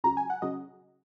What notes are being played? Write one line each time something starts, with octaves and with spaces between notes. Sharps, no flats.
C#2 C#3 F#3 A#5
G#5
F#5
C#3 F#3 D#5